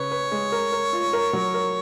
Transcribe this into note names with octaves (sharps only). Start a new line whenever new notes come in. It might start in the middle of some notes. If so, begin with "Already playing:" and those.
Already playing: C#3 B4 C#5
B4
G#3
A#4
A#4
F4
A#4
F#3
A#4